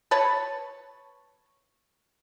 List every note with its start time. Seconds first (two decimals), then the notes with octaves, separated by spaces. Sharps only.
0.11 B4 C#5 A5